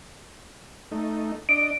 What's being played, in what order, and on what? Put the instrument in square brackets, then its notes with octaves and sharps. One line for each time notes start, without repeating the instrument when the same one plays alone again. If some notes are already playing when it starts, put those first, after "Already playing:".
[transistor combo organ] A3 D#4
[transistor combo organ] D4 D#5 [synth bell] D7